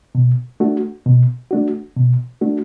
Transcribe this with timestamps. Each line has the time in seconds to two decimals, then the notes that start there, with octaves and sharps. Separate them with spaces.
0.15 B2
0.60 A3 D4 F#4
1.06 B2
1.51 A3 D4 F#4
1.96 B2
2.41 A3 D4 F#4